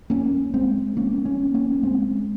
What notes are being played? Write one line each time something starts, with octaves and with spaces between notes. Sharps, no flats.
A#3 C#4
G#3 C4
A#3 C#4
A#3 C#4
A#3 C#4
G#3 C4